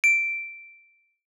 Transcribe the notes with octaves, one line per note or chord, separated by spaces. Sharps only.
D7